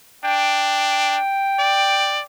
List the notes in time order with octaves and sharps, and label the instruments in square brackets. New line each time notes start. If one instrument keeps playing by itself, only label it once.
[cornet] D4 [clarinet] G5
[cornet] D5